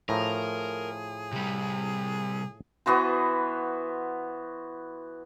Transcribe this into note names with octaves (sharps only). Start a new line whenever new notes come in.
A2 F3 G#4 A#4
C3 G3
E3 B3 F#4 C5